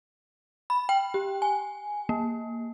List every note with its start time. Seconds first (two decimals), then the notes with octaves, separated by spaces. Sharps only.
0.70 B5
0.89 G5
1.14 G4
1.42 G#5
2.09 A#3